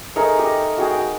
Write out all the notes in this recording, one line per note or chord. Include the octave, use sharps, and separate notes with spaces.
A3 D#4 G#4 A#4
G4 D#5
F#4 G#4 G5
G5